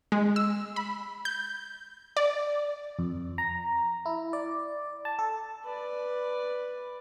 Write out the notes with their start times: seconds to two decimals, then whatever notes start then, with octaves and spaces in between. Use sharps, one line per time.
0.12 G#3
0.36 E6
0.76 B5
1.25 G6
2.17 D5
2.99 F2
3.38 A#5
4.06 E4
4.33 D5
5.05 A5
5.19 A4
5.65 B4 D5